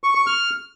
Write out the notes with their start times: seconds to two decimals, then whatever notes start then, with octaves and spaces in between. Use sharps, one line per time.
0.04 C#6
0.15 C#6
0.27 F6